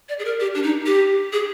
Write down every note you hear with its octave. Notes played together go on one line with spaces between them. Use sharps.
D5
G#4
A#4
G4
D4
D#4
G4
G#4